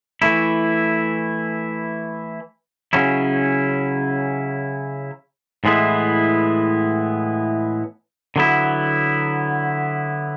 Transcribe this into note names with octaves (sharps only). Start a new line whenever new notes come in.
E3 A3 E4
C#3 F#3 C#4 E4
A2 E3 G#3 B3 E4
D3 F#3 B3 E4